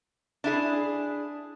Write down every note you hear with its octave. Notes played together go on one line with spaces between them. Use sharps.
D4 E4 G#4